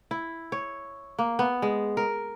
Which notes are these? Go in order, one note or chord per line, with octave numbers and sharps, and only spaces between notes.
E4
C#5
A#3
B3
G#3
A#4